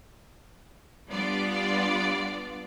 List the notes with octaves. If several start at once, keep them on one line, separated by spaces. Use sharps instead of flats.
G3 B3 D4 F4 D5